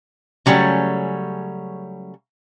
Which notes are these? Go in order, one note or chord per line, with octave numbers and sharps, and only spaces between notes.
C#3 F#3 G3 A3 C#4